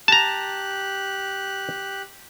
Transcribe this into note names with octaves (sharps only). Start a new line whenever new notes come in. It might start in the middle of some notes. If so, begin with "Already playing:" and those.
G4 A5 A#5 F#6